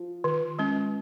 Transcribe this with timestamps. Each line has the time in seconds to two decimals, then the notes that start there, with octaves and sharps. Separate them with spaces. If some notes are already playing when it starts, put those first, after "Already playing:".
Already playing: F3
0.24 D#3
0.59 G#3 C#4